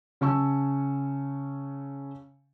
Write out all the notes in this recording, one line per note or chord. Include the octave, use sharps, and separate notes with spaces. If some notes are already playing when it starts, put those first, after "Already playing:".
C#3 C#4 A5 C#6 E6